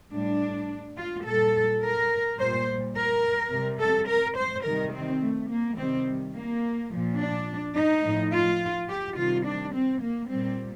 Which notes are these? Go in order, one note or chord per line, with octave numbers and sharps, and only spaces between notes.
A2 G3 D4
F4
A#2 G3 A4
A#4
A#2 G3 C5
A#4
C3 G3
A4
A#4
C5
C3 D#3 G3 A#4
C4
A3
A#3
C3 D#3 G3 C4
A#3
A#2 F3
D4
D#4
A2 F3
F4
G4
C3 D#3 G3 F4
D4
C4
A#3
A#2 G3 C4